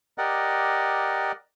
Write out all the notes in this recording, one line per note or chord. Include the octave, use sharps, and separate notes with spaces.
G4 A#4 D5 D#5 F#5